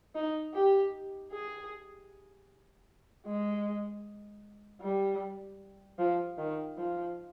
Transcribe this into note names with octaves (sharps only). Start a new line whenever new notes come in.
D#4
G4
G#4
G#3
G3
F3
D#3
F3